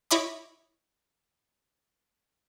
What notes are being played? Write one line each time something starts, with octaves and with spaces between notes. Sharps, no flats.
E4 C#5 D#5 B5 D6